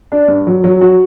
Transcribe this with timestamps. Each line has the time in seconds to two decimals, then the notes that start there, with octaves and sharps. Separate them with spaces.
0.12 D4
0.28 G2
0.47 F#3
0.64 F#3
0.81 F#4